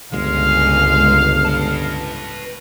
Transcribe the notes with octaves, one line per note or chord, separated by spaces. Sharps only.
G1 C#2 G#3 F5
B4 A5